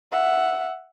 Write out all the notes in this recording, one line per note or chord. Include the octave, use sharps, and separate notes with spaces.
E5 F#5